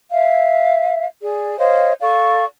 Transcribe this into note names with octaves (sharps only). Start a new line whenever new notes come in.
E5 F5
G#4 D5
C5 C#5 D#5 F5
A4 D5 F5 C#6